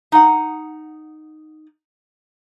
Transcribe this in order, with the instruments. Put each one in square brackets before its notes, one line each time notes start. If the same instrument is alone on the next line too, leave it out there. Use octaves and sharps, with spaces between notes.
[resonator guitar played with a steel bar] D#4 F#5